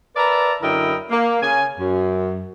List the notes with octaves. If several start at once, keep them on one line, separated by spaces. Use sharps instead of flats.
A#4 B4 D5 E5 A5 A#5
F#2 D3 E4 A#4 D#5 G5
A#3
C#3 G#5
F#2